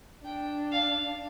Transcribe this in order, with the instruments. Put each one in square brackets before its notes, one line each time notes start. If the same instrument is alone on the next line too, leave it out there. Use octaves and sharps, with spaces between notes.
[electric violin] D4 [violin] G5
[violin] F5